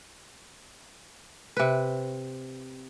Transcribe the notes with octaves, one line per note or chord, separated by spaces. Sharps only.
C3 B4